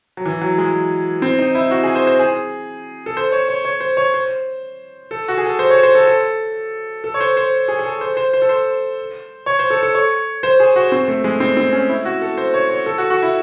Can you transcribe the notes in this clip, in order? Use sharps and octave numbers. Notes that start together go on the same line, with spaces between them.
F#3
E3
F#3
G#3
C4
D#4
E4
F#4
G#4
C5
C5
G#4
A4
C5
C#5
C#5
C#5
C5
C#5
C5
A4
F#4
G#4
A4
C5
C#5
C5
A4
A4
A4
C#5
C5
C5
G#4
G#4
A4
C5
C5
C5
A4
C5
C#5
C5
A4
A4
C#5
C5
G#4
F#4
C4
A3
G#3
C4
C4
C#4
E4
F#4
A4
C5
C#5
C#5
A4
F#4
F#4
E4